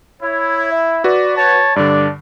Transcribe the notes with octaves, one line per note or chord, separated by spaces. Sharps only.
E4 C#5
E5
F#4 B4 D5
C#5 A5
G2 D3 D4 D5